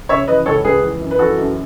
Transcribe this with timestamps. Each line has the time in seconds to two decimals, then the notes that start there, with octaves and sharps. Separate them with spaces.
0.09 C#3 C#5 E5
0.27 E3 B4 D#5
0.46 C#2 A4 C#5
0.64 C#2 G#4 B4
0.82 E3
1.01 F#2
1.11 B4
1.19 E3 F#4 A4
1.37 F#2